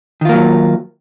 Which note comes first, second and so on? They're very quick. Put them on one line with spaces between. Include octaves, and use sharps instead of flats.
D#3 F4 A#3 F#3